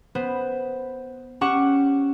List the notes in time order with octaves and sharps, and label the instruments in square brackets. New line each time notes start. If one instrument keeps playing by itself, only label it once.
[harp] B3 C5
C#4 G4 F#5 C#6 E7